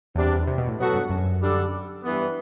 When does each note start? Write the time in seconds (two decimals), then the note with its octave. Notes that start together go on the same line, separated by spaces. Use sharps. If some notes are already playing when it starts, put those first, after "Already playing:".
0.15 E2 C3 G3 D4
0.47 C3
0.58 B2
0.68 A2
0.79 F#3 B3 F#4 A4
0.94 G2
1.10 F#2
1.41 D3 G3 D4 A4
2.04 G2 E3 B3